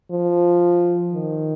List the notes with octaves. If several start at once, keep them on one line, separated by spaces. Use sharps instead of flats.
F3
D#3